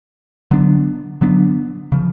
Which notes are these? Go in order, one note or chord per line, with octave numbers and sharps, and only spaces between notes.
D3 F#3 B3 D4
D3 F#3 B3 D4
C#3 F3